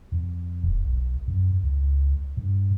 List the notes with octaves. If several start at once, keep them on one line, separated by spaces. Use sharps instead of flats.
F2
D#1
B1
F#2
C#2
G2